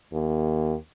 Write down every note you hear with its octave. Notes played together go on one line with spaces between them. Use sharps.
D#2